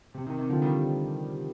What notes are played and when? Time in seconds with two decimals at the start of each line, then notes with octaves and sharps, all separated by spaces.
0.15 C3
0.27 C3 D#3
0.38 C3 D#3
0.49 D3 F3
0.62 D#3 G3